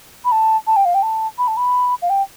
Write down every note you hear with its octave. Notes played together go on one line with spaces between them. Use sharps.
B5
A5
A5
G5
F5
G5
A5
B5
A5
B5
F5
G5